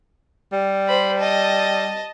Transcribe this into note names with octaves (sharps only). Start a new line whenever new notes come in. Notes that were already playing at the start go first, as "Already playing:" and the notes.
G3
C5 B5
D#5 A5